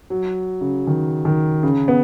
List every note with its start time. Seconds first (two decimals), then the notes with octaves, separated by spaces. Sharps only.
0.10 F#3
0.61 C#3
0.87 D#3
1.25 D#3
1.63 C#3
1.88 B3